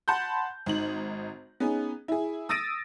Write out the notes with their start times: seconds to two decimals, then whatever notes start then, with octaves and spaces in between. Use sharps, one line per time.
0.08 F#5 A5 B5 C6 G6
0.66 G#1 D#4 F#7
1.60 B3 C#4 D#4 G#4
2.08 E4 G#4
2.49 D#6 E6 A6 A#6 D7 D#7